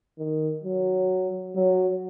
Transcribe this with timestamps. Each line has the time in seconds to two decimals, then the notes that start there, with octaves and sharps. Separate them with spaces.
0.19 D#3
0.64 F#3
1.56 F#3